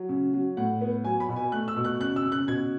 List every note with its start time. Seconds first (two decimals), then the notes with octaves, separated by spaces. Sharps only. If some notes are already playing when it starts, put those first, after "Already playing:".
Already playing: F#3
0.09 C#3
0.34 F#3
0.57 A2 F#5
0.81 B3
1.04 F#3 G#5
1.20 B5
1.29 B2
1.36 G#5
1.52 A3 F#6
1.68 E6
1.76 B2
1.84 F#6
2.00 C#3 F#6
2.16 E6
2.24 C#3
2.32 F#6
2.47 B2 G#6